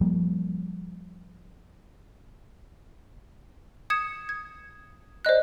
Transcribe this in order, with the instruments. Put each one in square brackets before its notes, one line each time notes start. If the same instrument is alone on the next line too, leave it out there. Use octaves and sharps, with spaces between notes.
[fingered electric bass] F3 G3 A#3
[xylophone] D#6 G#6 C#7 E7
G#6
C5 D5 D#5 F#6